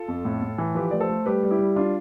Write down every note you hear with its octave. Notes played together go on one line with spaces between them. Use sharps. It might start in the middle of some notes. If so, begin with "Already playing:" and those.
Already playing: F4 A4
F2
A2
A2
E3
F3 G4 B4
A3 D5
A4 C5
A3
G3 G4 B4
G3
E4 G4
G3
D4 F4